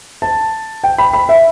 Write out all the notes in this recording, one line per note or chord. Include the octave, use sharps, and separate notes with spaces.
A5
G5
B5
B5
E5